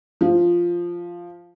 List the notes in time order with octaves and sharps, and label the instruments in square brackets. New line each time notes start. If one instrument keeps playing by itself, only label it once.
[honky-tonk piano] F3